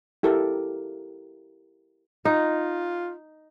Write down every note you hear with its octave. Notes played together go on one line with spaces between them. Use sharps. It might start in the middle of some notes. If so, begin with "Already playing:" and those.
E4 G4 A4 A#4
D#4 F4